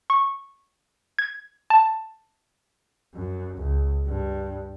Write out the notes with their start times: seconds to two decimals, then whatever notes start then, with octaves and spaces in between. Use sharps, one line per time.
0.10 C#6
1.19 G#6
1.70 A5
3.14 F#2
3.58 C#2
4.06 G2